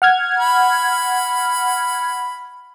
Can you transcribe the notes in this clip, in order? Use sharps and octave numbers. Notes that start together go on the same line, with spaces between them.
F#5 F6 G#6
B5